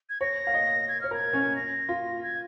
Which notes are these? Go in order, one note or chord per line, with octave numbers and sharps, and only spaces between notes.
G#6
C#5 A#6
F5
D#5
G#6
C#5 F6
A#4 G#6
C#4
A#6
F4
G#6